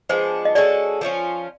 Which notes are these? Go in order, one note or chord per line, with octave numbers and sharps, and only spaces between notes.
F3 G#3 B3 D4 C5
D#5
G#3 C#4 F#4 A4 D5
F3 A#3 C#4 F4